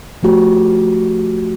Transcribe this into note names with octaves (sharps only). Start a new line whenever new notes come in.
F3 A3 F#4 G4